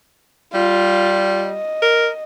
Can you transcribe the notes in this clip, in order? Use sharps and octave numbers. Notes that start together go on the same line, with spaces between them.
G3 F4
D#5
A#4